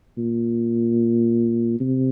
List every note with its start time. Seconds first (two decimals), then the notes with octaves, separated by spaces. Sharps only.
0.18 A#2
1.80 C3